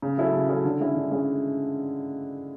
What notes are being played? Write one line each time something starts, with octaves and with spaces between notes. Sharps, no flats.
C#3
F#3 C#4 E4 A4
C#3
F#3 C#4 E4 A4
D3
G#3 C#4 E4
D3
G#3 C#4 E4